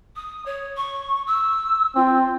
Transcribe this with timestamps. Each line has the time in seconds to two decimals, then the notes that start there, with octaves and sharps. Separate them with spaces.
0.16 D#6
0.45 C#5
0.76 C#6
1.26 E6
1.95 C4 F4